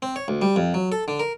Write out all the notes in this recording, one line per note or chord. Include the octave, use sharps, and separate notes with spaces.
C4
C#5
D2
G3
F2
F#3
A4
D3
A#4